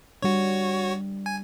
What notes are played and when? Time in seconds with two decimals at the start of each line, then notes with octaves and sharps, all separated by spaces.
0.22 G3 D4 F#4 C#5
1.26 G#5